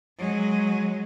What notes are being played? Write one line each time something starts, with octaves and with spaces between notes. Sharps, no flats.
F#3 G#3